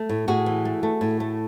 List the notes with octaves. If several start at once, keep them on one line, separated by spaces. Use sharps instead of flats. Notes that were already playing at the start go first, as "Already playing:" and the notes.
Already playing: A3
A2
A2 F#4 G#4
E3
A3
A3
A2
A3